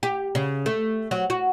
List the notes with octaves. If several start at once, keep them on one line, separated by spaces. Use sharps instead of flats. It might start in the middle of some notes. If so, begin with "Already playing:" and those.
G4
C#3
A3
F#3
F#4